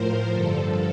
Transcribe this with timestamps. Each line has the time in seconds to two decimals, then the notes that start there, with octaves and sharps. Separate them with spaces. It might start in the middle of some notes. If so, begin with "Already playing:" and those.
Already playing: A2 F3 A#4 C5
0.31 G2 D3 F3 A4